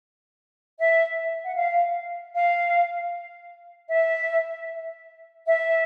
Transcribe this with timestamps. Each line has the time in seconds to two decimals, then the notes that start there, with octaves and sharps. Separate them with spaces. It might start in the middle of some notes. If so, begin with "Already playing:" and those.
0.80 E5
1.44 F#5
1.57 F5
2.35 F5
3.91 E5
5.47 E5